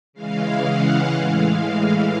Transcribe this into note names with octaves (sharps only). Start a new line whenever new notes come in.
C#3 E3 G#3 F5
F#5
A2 E3 G#3 F5